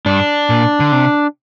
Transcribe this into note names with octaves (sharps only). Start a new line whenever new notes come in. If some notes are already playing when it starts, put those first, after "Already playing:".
G2 D4
A#2
D3
C3